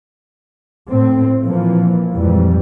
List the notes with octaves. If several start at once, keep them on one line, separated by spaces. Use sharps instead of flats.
A2 A3 C4
A#2 E3 F3 A#3
F2 G#2 E3 G3